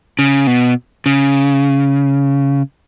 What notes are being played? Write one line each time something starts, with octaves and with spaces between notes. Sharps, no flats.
C#3
B2
C#3